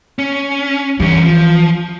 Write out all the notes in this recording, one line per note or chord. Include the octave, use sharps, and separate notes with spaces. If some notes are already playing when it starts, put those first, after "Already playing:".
C#4
G2 E3 C#4
F3